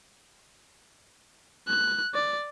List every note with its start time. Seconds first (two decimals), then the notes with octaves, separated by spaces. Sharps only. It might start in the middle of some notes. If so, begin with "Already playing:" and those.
1.68 F#6
2.14 D5